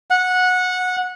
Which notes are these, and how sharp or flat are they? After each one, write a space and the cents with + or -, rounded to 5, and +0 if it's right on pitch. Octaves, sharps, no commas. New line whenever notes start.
F#5 -15